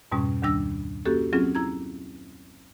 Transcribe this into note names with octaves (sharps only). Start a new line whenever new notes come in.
F2 G#2 B2 G3 C#4
D2 D#3 G3 D4 E6 A#6
A#3 C#4 F#4 G4 A4
F#3 C4 C#4 F4 G#4
E4 A#5 G#6